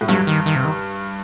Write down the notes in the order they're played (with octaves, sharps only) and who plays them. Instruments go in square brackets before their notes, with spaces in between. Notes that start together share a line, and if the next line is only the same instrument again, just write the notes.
[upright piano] A2
[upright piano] G2 [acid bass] F#3
[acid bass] D#3
D#3
C3
D#3